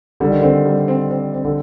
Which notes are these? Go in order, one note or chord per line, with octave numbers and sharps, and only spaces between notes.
D3 G3
D#3
D3 C4
G3
C4
C4
C4
D3